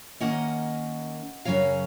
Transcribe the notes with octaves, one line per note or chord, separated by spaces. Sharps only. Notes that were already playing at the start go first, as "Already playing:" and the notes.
D#3 A#3 C#4 D#5 F#5
F#2 C#3 F#3 C#4 C#5 F5